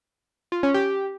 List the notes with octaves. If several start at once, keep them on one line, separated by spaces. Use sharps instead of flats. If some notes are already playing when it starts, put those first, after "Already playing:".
F4
C#4
G4